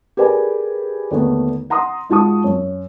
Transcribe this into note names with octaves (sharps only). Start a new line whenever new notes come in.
G4 G#4 A#4 B4 D5 G#5
D#2 D3 A3 B3
F#5 A#5 C6 D#6
G#2 F4 F#4 A5 C#6 D#6
F#2